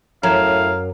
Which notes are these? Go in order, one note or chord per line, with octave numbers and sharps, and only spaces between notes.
F#2 A2 F5 A#5 G#6 E7